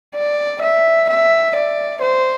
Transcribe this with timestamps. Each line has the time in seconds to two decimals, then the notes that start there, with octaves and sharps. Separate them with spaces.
0.15 D5
0.62 E5
1.09 E5
1.55 D5
2.02 C5